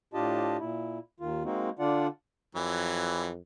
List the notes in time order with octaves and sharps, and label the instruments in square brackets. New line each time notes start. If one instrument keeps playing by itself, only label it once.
[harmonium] A2 D4 F4 G4 D#5 A5
A#2 E4
D#2 D#3 F4
G#3 A#3 C4 D#4 F#4
D3 D4 F4 D5 F#5
[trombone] F2 [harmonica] E3 F#3